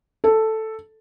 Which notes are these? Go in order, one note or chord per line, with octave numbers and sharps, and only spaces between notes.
A4